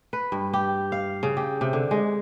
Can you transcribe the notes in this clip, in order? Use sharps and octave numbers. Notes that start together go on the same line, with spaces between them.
B4
G2
G4
F5
C#3
G4
C3
D3
G#3